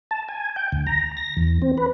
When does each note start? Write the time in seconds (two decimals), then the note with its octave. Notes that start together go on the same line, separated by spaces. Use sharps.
0.11 A5
0.28 G#5
0.56 G5
0.72 D2
0.87 A#5
1.17 A#6
1.37 E2
1.62 C4
1.78 B4